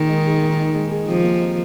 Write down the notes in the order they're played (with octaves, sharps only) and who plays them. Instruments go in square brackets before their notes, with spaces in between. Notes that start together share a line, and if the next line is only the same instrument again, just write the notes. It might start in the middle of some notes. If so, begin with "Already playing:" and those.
Already playing: [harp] A#2 D#4 G#4 [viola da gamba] D#3
[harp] G#3
G#4
A#2
D#4
G#3
G#4
[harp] C3 [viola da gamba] F3
[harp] A#3
D#3